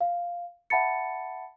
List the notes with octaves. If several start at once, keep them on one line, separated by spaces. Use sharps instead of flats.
F5
E5 F#5 A5 B5 A6 C#7